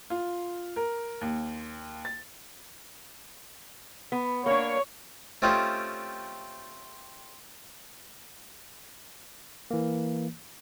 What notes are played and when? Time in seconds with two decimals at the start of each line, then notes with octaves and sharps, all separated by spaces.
0.10 F4
0.76 A#4
1.21 D#2
2.05 A6
4.12 B3
4.46 A#3 D4 C#5
5.42 A3 C4 C#4 F4 G4 D#5
9.71 E3 A#3